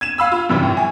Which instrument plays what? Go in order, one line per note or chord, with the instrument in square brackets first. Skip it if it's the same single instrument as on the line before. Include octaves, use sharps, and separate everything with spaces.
[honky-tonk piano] G#6 D#7 E7
F5 B5 E6
F4
F#2 C3 E3 G3
A2
G#5